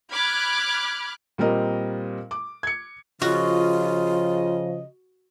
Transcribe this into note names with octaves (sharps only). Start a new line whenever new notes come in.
B5 D6 F6 F#6 G#6
A#2 G3 C4 A#4 D#5
D6
G#6 C#7
C#3 F3 F4 F#4 D#5